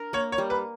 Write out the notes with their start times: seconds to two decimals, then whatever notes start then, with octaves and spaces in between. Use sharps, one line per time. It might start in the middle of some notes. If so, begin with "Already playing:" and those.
Already playing: D4 A#4
0.13 A#3 C#5
0.32 C#5
0.38 G3
0.50 B4